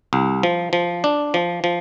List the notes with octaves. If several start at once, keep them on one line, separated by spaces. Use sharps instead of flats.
C2
F3
F3
D4
F3
F3